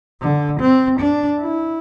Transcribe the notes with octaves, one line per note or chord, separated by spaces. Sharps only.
D3
C4
D4
E4